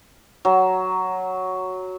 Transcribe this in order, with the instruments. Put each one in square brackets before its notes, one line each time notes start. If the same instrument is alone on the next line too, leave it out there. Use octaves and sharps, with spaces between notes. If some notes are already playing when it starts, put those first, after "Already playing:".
[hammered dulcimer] F#3